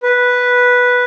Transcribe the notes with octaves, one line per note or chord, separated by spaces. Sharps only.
B4